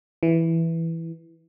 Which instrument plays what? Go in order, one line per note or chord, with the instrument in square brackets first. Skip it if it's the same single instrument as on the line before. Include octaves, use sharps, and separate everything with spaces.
[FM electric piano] E3